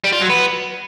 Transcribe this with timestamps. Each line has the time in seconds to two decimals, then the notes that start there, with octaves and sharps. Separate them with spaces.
0.04 G3
0.13 F4
0.21 F#3
0.29 B3